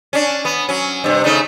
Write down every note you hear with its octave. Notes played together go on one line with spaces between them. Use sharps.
C#4 D4
B3
F#3 C#4
G2 C3
C#3 A3 D#4